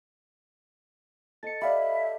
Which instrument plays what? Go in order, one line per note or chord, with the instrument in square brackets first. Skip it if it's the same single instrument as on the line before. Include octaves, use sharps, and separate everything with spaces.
[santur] A4 D#5 [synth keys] A6 C#7
[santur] G4 [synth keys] D5 F5 B5 [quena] E5